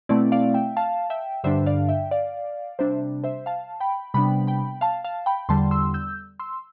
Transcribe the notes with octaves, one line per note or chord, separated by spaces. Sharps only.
B2 A3 C4 E4 D5
D5 F5
E5 G5
F5 A5
E5 G5
G2 D3 G3 D4 C5 E5
D5 F5
E5 G5
D5 F5
C3 G3 D4 C5 E5
C5 E5
F5 A5
G5 B5
C3 G3 B3 D4 G5 B5
G5 B5
F5 A5
F5 A5
G5 B5
E2 D3 G3 A5 C6
C6 E6
E6 G6
C6 E6